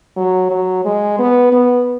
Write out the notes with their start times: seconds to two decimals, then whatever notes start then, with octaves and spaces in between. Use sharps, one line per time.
0.17 F#3
0.51 F#3
0.85 G#3
1.19 B3
1.52 B3